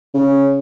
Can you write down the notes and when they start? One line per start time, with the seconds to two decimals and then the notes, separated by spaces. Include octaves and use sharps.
0.14 C#3